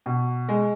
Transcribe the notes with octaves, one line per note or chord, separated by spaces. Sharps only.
B2
G#3